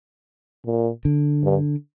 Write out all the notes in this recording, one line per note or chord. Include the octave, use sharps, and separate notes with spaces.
A#2
D3
G2